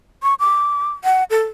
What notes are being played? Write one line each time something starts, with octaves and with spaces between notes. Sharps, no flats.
C#6
D6
F#5
A4